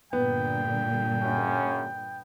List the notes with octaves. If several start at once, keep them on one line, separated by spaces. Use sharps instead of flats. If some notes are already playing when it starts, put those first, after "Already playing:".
G2 A#2 D3 B3 G5
F#2 C#3 C#4